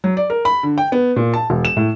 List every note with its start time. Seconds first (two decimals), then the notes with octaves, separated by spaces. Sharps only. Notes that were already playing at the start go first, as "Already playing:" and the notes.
0.04 F#3
0.17 D5
0.30 A#4
0.45 B5
0.63 D3
0.78 G5
0.92 B3
1.16 A#2
1.34 A5
1.50 E1
1.65 E7
1.77 A2